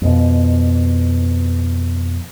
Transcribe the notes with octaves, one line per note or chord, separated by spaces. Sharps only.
F2 B2